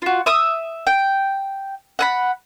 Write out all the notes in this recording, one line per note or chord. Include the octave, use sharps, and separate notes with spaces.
F4 F#4
E5 D#6
G5
F#5 G#5 B5